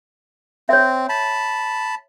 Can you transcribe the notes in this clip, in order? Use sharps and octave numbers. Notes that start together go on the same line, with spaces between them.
C4 C#5 E5
A5 B5